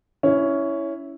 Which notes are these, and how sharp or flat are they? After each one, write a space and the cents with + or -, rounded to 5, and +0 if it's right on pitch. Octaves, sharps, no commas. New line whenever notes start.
C#4 +10 E4 +0